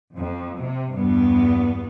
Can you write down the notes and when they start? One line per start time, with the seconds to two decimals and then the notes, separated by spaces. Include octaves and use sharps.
0.17 F2
0.59 C3
0.96 E2 G2 B3